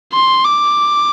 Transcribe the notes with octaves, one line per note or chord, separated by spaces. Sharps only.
C6
D6